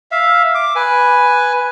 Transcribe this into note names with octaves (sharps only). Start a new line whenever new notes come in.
E5 F5
D6
B4 G#5